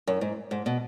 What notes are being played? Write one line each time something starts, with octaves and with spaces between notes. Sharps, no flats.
F#2
G#2
G#2
B2